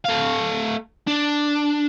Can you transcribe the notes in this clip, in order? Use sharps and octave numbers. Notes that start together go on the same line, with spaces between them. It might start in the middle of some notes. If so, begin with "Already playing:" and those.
A3 F5
D4